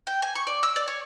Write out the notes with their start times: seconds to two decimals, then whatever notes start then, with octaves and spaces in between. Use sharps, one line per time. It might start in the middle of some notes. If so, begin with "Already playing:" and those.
0.07 G5
0.22 G#5
0.35 C#6
0.47 D5
0.63 E6
0.76 D5
0.88 C#5